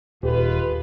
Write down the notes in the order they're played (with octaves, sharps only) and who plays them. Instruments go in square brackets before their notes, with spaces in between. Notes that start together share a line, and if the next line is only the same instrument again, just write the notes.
[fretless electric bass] D#1 [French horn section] G#3 F4 B4 [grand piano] G4 A4